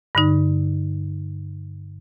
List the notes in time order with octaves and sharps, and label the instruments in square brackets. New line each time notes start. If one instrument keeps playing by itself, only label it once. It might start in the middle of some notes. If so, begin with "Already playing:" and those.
[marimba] G2 D3 D#4